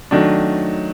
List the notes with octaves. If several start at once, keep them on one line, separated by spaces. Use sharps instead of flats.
D#3 F#3 A3 D4